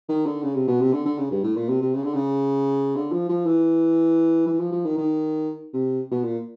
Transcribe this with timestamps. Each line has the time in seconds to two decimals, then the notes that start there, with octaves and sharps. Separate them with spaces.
0.09 D#3
0.26 D3
0.43 C#3
0.55 C3
0.68 B2
0.81 C3
0.93 D3
1.06 D3
1.18 C#3
1.31 G2
1.44 A2
1.56 A#2
1.69 C3
1.82 C3
1.94 C#3
2.04 D3
2.14 C#3
2.96 D3
3.12 F3
3.29 F3
3.46 E3
4.47 E3
4.60 F3
4.72 F3
4.85 D#3
4.98 D#3
5.74 C3
6.11 B2
6.24 A#2